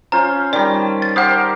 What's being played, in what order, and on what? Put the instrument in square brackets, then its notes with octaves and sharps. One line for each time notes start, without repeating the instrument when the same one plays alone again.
[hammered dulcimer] C#4 F4 C5 [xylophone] A#5
[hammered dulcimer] D#3 G3 [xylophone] D5
[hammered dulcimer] A5
[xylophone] A6
[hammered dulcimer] G4 A#4 C5 [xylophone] F#5 D#6